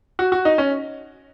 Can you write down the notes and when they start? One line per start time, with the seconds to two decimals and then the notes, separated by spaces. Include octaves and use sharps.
0.19 F#4
0.32 F#4
0.45 D#4
0.58 C#4